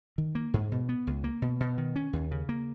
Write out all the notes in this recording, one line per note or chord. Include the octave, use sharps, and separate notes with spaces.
D#3
A#3
G#2
B2
B3
C#2
A#3
B2
B2
D#3
C#4
D#2
C#3
A#3